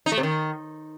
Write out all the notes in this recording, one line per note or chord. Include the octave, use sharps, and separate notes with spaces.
D#4
A3
C3
D#3